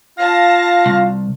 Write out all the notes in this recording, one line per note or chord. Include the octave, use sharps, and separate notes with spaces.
F4 F5 A5 A#6
C2